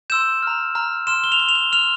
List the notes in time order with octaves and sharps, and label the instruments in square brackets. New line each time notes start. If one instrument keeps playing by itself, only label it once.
[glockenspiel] C6 E6 G6 E7
A#5 F6
A#5 F6
C6 F6 E7
G7
F7
C6 F6 G7
F7
G7
C6 F6 F7